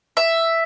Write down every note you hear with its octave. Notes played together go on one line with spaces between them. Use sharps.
E5